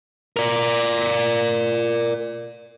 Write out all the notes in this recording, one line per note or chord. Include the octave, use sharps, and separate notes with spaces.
A#4 D5